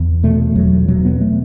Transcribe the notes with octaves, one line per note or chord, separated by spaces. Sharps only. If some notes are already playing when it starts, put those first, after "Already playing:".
Already playing: E2
B2 A3
E2 F#3
B2 F#3
B3
A3